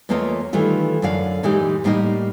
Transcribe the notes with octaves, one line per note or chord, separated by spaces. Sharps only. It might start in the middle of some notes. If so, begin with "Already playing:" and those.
E2 A3 A#3 F4 C#5 D#5
D#3 E3 G3 A3 F4
F#2 D3 C#5 D5 F5
A#2 E3 G#3 D#4 E4 G4
A2 G3 A#3 D#4 C5 D#5